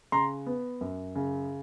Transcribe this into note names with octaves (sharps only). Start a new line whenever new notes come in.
C#3 A#5 C6
B3
F#2
C#3